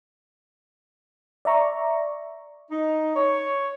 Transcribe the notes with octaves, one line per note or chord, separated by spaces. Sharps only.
D5 E5 A#5 C#6
D#4
C#5